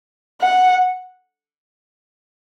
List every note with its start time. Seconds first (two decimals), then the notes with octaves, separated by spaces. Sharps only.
0.41 F#5